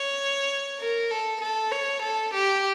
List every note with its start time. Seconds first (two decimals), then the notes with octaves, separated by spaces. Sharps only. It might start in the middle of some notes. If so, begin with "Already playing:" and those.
Already playing: C#5
0.79 A#4
1.11 A4
1.41 A4
1.72 C#5
2.02 A4
2.34 G4